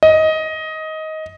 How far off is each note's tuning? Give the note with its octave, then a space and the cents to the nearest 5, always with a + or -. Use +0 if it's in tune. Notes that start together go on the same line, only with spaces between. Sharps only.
D#5 +15